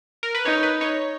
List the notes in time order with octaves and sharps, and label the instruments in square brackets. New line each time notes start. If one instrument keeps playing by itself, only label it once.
[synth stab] A#4
B4
[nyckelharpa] D#4 [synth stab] C#5
[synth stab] B4
C#5